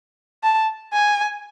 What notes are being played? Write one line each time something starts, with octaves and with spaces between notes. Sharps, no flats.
A5
G#5